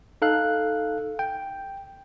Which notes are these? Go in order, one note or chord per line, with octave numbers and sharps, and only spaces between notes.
D#4 A4 F5 F#6
G5